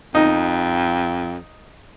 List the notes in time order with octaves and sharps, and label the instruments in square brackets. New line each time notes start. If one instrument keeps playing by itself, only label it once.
[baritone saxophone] F2 [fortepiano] D#4